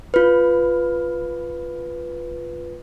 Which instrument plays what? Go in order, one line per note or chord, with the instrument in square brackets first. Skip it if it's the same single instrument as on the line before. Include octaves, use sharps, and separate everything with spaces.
[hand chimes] F4 B4